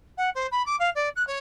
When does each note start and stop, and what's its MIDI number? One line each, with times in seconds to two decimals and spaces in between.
0.17 0.29 78
0.34 0.46 72
0.51 0.65 83
0.66 0.76 86
0.79 0.89 77
0.95 1.09 74
1.15 1.25 90
1.27 1.38 73